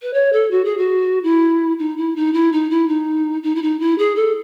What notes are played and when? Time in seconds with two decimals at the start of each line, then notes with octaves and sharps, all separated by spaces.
0.02 B4
0.13 C#5
0.32 A4
0.50 F#4
0.64 G#4
0.77 F#4
1.23 E4
1.78 D#4
1.96 E4
2.15 D#4
2.33 E4
2.52 D#4
2.70 E4
2.88 D#4
3.42 D#4
3.55 E4
3.62 D#4
3.79 E4
3.98 G#4
4.15 A4